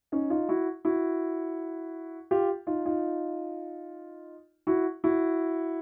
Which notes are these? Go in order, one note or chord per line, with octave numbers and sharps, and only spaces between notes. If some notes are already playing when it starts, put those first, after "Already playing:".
C#4 D#4
D#4 F4
E4 F#4
E4 F#4
F4 G4
D#4 F4
D#4 F4
E4 F#4
E4 F#4